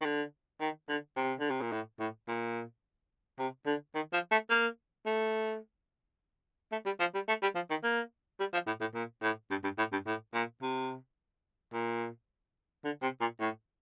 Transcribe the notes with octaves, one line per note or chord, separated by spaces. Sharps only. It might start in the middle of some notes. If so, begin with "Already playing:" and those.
D#3
D3
D#3
D3
C3
D3
C3
A#2
A2
A2
A#2
C3
D3
D#3
F3
A3
A#3
A3
A3
G3
F3
G3
A3
G3
F3
D#3
A#3
G3
F3
A2
A2
A#2
A2
G2
G2
A2
G2
A2
A#2
C3
A#2
D3
C3
A#2
A2